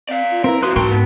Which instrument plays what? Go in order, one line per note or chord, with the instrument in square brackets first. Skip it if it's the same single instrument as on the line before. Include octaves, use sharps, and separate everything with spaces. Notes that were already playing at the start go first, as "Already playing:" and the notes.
[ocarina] C4 [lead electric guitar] D5 F5
[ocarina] F4
[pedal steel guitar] C4 E4 [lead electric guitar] A#4 [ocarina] B4
[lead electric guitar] F#2 E3 [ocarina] F#4 [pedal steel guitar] B4 C6 D#6
[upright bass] G#2 [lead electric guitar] A#4 A5 [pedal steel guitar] G5 C6 C#6
[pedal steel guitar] B3